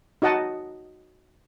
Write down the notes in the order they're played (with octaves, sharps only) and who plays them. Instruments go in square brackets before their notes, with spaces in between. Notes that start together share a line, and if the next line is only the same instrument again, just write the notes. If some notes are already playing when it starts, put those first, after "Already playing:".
[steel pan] D#4 F#4 D#5 F#5 A5